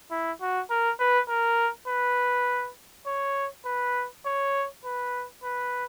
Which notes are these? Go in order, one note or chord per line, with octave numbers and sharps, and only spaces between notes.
E4
F#4
A#4
B4
A#4
B4
C#5
B4
C#5
B4
B4